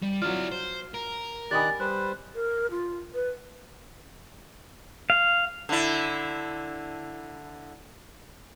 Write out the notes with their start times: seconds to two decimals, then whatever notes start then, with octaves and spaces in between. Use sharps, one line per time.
0.02 G3
0.22 F#3 E4 F4 D5 F6
0.52 C5
0.94 A#4
1.51 D#3 G4 D5 G#5 B5 D#6 F#6 A6
1.80 G3 B4 C5 F#6
2.35 A#4
2.71 F4
3.14 B4
5.10 F5
5.69 D3 E4